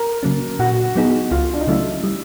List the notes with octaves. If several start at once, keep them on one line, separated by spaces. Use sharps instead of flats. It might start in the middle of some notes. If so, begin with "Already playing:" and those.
Already playing: A#4
C#3 F#3 A#3 C#4
A#2 F#4
F#3 B3 D#4 G#4
C#2 F4
D4
D#4
C#3 F#3 A3 C#4 E4
G3